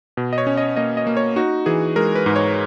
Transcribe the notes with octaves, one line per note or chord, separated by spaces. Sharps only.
B2
D#5
C#5
C#4
D#5
A#3 D#5
D#5
A#3
C#5
D#4 F#4
E3 G#4
G#3 A#4
B4
G#2
C#5